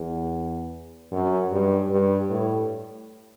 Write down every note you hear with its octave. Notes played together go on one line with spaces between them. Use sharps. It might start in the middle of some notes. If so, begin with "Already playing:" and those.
Already playing: E2
F#2
G2
G2
A2